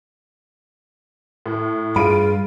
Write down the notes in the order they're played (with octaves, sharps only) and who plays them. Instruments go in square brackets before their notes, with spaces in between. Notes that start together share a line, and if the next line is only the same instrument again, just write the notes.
[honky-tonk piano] A2
[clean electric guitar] G2 B5 [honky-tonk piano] F4 D7 D#7 [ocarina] G#4